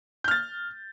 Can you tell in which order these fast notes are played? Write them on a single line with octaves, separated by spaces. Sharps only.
G6 F6 A6